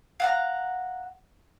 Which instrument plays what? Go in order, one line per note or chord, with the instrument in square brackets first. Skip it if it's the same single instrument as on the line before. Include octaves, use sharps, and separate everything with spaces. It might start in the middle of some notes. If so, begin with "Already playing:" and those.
[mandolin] F5 F#5 A#5